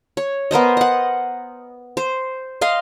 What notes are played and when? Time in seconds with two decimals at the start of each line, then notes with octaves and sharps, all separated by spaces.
0.17 C#5
0.51 B3 A#4 C5 D#5
0.77 D#5 F#5
1.97 C5
2.61 D#5 F5 C6